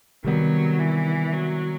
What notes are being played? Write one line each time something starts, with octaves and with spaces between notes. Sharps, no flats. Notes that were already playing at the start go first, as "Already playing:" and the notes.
C3 D#3 F#3 G3 B3
E3
F#3